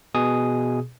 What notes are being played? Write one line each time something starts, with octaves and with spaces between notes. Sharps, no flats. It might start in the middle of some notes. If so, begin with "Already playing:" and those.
B2 G#4 D#6